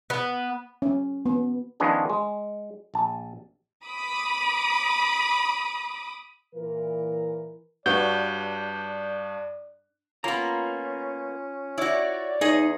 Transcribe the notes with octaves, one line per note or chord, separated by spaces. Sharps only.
B3
C#4
B3
D#3 F3 B3 C#4 D4 G#4
G#3
A#1 A5
B5 D6 D#6
A#2 E3 A#4
G2 D4 F#4 B4 C#5 D5 G6
A#3 B3 C#4 F4 A#5
E4 F#4 C#5 D5
E2 D#4 G#4 D#5